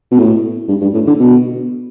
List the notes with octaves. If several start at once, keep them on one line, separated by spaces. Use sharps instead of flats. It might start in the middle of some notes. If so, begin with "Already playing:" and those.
B2
A2
G2
G2
A2
D3
B2